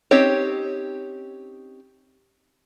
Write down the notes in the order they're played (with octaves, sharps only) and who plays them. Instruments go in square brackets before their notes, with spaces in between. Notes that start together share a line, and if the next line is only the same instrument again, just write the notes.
[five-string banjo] C4 C#4 D#4 G4 C#5